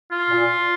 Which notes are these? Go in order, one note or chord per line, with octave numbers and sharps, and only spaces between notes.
F4
A#2